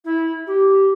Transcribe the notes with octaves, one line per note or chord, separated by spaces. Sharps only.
E4
G4